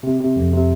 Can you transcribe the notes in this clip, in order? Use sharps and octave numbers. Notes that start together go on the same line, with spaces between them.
C3
C3
F2
C3